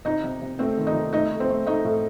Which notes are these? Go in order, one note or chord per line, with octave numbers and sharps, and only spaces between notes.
C3 D#4 D#5
C3
C3
A3 C4 C5
D#3
D#4 D#5
C3
A3 D#4 D#5
A3
C4 C5
A3
A3 D#4 D#5
A2